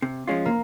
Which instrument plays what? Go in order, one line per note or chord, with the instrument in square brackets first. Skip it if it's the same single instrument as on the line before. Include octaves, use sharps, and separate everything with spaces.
[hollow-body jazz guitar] C3
F3 G#3 C#4 F4
[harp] A#3